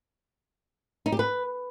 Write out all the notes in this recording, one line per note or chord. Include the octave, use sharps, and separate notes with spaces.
D#4
G4
B4